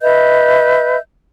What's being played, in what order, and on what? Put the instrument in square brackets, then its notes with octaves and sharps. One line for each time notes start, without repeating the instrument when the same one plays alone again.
[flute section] B4 D#5 E5 G6